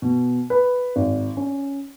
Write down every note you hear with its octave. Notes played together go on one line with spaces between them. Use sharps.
B2
B4
G#1
C#4